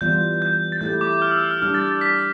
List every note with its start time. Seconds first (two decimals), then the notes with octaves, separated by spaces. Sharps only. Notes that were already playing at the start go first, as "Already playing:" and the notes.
0.01 E3 G3 B3 F4 G6
0.42 G6
0.72 A6
0.81 A3 E4 G4 G6
1.01 D6
1.22 F6
1.31 E6
1.42 E6
1.51 F6
1.61 G3 D4 G4 F6
1.74 A6
1.89 A6
2.01 B6